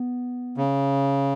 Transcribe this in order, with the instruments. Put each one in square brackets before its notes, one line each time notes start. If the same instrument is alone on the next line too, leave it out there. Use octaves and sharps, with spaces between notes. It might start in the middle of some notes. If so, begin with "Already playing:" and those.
Already playing: [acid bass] B3
[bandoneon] C#3